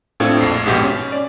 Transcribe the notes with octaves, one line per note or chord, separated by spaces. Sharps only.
A2 C4 D4 F4 A4 G#6
A#1 F2 C7
A#1 G#2 B2 G4 B6
C#4
D5